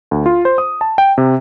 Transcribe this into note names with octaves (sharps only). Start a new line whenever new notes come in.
D2
F4
C5
D#6
A5
G5
C3